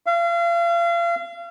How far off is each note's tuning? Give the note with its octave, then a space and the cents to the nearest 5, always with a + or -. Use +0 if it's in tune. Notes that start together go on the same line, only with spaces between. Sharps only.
F5 -35